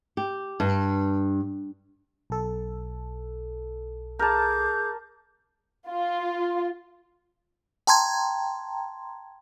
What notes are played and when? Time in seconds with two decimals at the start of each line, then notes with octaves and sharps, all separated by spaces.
0.17 G4
0.60 G2
2.30 B1 A4
4.19 G#4 A#4 A5 D6 G6
5.90 F4
7.87 G5 A5 A#5 C6 G#6